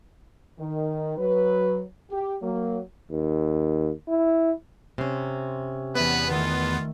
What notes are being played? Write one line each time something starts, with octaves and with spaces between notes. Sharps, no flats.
D#3
F#3 B4
G4
F#3 A#3
D#2
E4
C3 C#4 C6 C7
E2 B3 B4 D5 E5
D#3 A3 F4